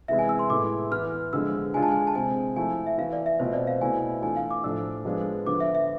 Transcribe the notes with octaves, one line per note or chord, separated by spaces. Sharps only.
C3 E3 G#3 B3 E4 E5
G#5
E6
C6
A2 G#3 B3 E4 D6
E3 B3 E4 F6
D3 F3 G#3 B3 E6
D3 G#3 D4 F4 G#5
A5
G#5
A5
C3 G#3 C4 G#5
F3 A3 E4 G#5
E5
E3 B3 E4 F5
D5
E5
B2 A3 C4 F4 C5
D5
F5
B2 A3 E4 G#5
E3 A3 D4 F4 G#5
F5
D6
A2 F3 A3 D4 F4 E6
F3 G#3 B3 D4 F4
D3 F3 B3 D6
E5
E5